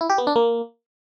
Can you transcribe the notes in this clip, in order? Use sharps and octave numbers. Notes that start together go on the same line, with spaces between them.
E4
G4
B3
D4
A#3